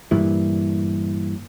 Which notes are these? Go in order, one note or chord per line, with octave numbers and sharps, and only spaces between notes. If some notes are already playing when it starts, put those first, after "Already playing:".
G2 A#2 E3